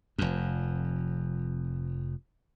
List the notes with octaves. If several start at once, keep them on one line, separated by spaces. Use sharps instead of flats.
F1 F2